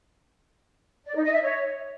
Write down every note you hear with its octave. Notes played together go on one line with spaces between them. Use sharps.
D5
D#4
D#5
E5
C#5